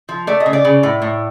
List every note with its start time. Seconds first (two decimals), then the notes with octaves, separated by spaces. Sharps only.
0.09 F3
0.27 A3 D5
0.40 D#5
0.46 C#3
0.53 D5
0.65 C#3
0.83 A2
1.02 A2